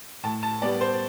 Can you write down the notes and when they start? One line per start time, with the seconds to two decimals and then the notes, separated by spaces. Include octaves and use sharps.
0.23 A2 A5
0.43 A5
0.62 G3 B3 D5
0.81 C5